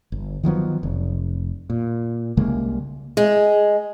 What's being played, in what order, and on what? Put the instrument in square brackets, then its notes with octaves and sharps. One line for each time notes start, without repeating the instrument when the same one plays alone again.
[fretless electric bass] G1
D#3 F3 F#3 B3
F1
A#2
C2 C#3 G#3 A#3
[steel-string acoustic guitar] G#3